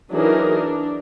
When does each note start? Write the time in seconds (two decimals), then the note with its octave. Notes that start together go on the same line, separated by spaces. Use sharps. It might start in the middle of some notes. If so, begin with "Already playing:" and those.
0.11 E3 F#3 D4 D#4 G#4 A#4
0.55 D4